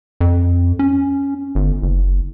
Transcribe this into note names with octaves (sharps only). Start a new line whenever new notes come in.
F2
C#4
G1
F#1